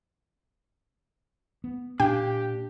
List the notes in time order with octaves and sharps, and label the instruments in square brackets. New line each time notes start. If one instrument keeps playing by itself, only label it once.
[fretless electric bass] B3
[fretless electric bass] A#2 [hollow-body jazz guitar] D4 F5 [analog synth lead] G4 [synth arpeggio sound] G5